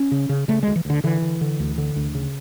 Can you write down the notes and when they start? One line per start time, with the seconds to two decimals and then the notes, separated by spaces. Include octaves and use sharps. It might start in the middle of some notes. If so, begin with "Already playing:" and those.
Already playing: C#4
0.11 C#3
0.29 C#3
0.48 C#3 A3
0.63 D2 G#3
0.76 E3
0.85 D2 D3
1.04 D3 E3
1.22 D3
1.41 D3
1.60 D2
1.78 D3
1.96 D2
2.15 C#3